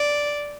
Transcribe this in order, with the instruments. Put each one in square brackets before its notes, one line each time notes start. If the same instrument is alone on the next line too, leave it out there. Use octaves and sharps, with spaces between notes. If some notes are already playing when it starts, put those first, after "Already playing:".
Already playing: [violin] D5